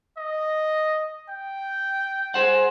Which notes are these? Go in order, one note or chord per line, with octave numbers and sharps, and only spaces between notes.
D#5
G5
G#4 C5 F#5